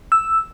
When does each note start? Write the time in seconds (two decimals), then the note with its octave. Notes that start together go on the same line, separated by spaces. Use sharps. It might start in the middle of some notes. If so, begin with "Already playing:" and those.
0.12 E6